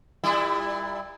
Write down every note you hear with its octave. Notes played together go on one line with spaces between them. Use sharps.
A#2 G3 E4